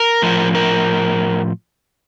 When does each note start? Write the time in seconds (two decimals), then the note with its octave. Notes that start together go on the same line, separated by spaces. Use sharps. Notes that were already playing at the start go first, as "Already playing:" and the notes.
Already playing: A#4
0.22 A2 F3
0.55 A#4